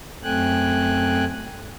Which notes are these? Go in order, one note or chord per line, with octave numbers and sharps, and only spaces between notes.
F#2 A3 C4 G5 G#5 F#6